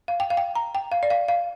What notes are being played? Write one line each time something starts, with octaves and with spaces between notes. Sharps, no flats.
F5
G5
F5
G5
A#5
G5
F5
D5
F5
F5